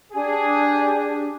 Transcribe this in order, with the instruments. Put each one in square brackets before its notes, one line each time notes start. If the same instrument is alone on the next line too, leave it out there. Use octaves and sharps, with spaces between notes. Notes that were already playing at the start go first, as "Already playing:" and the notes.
[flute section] D4 G4 [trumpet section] G#4